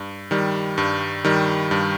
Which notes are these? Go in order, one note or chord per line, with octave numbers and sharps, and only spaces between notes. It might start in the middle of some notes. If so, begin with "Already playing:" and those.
Already playing: G2
D#3 G3
G2
D#3 G3
G2